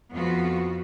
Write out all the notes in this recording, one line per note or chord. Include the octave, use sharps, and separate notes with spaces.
F2 F3 B3 F4 F#4